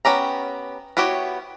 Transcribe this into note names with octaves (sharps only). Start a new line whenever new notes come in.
B3 C#4 G4 A#5
B3 E4 F#4 G4 C#5